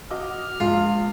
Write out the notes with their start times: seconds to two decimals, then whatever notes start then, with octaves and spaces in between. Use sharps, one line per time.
0.11 F#4 D#5 D6 F6
0.60 A#1 G#3 F4